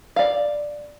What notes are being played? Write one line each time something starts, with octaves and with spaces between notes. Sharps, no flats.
D5 F5